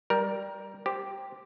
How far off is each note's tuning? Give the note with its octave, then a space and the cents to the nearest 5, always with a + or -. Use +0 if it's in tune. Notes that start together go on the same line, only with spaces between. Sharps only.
G3 +0 A#4 +15
G4 +0 C5 +0